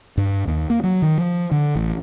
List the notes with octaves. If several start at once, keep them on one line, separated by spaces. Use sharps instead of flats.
G2
D#2
A#3
F#3
D#3
F3
D3
A1